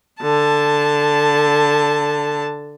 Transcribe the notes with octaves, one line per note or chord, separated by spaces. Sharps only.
D3 A5